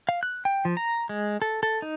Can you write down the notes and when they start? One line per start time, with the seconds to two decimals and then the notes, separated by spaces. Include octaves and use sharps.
0.09 F5
0.23 F#6
0.45 G5
0.65 F3
0.77 A#5
1.09 G#3
1.42 A4
1.63 A4
1.82 D#4